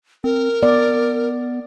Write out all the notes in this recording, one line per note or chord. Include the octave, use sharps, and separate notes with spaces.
C4 A#4
B3 D5